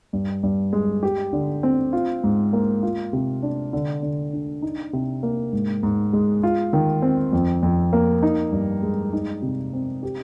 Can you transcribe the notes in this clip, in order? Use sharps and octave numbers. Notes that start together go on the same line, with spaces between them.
G2
G2
G#3
G4
D3
C4
F4
G#2
A#3
F4
C3
D4
D3
D3
D4
D#4
C3
A#3
G#2
G#2
G#3
F4
D#3
C4
F2
F2
A#3
D#4
G2
G#3
D#4
C3
C4
G4